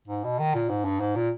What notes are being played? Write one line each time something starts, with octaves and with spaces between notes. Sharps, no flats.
G#2
B2
D#3
A#2
G#2
G2
G#2
A#2